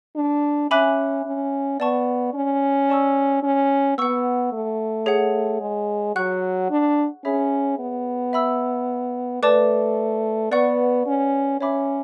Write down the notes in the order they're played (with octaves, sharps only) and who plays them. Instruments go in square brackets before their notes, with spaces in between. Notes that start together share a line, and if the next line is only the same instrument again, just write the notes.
[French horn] D4
[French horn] C#4 [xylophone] E5 G#5 B5 D6 F#6
[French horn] C#4
[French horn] B3 [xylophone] D5 A5 C#6
[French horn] C#4
[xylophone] D5 A5 C#6 E6
[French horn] C#4
[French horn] B3 [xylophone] F#5 C#6 E6
[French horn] A3
[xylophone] G#4 C#5 F#5
[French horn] G#3
[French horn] F#3 [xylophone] F#5 C#6 F#6
[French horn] D4
[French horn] C#4 [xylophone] G#4 C#5 E5 B5
[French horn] B3
[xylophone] E5 B5 E6
[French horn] A3 [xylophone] B4 D5 A5 D6
[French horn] B3 [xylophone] B4 D5 F#5 C#6
[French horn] C#4
[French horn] C#4 [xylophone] C#5 E5 B5 D6